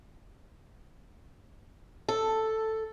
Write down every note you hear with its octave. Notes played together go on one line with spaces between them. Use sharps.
A4